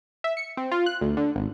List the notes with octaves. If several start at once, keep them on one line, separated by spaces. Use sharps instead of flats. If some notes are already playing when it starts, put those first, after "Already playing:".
E5
C#7
C4
F4
F#6
D2
D3
G#1